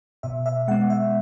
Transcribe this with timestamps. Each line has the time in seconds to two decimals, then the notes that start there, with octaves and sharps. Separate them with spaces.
0.23 B2 E5
0.46 E5
0.68 G#3 F#5
0.71 B3
0.90 E5